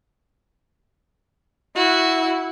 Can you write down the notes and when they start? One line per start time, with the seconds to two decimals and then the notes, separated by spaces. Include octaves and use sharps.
1.76 E4 F#4